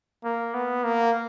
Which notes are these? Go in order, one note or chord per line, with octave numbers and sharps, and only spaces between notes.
A#3
B3
A#3